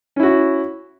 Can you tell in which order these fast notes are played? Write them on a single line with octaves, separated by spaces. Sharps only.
C#4 E4 F#4